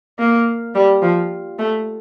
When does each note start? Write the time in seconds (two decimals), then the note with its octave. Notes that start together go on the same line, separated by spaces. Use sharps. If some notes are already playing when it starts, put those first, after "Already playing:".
0.19 A#3
0.75 G3
1.03 F3
1.59 A3